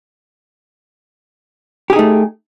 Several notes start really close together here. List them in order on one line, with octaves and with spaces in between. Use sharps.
G4 G#4 D#4 A3